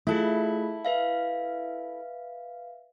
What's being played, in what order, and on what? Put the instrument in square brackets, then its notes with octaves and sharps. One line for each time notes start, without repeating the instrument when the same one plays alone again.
[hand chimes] A3 F4 G#4 [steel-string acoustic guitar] E4 A4
[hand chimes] B4 E5 F5